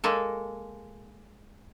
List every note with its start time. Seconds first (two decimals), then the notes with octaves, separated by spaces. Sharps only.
0.04 G#3 A#3 A4